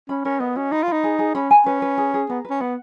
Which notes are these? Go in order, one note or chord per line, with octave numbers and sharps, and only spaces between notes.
C#4 B5
C#4 A#4
B3 D#5
C#4 F#4
D#4 B5
F4
D#4 B5
G#4
G#4
C#4 B5
G#5
C#4 B4
B4
G#4
G#4
B3 A#5
B4
C#4
B3 F#5